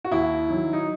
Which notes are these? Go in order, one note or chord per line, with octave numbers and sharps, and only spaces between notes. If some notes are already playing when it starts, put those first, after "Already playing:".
F#4
D#2 E4
D#3 F#3
D#4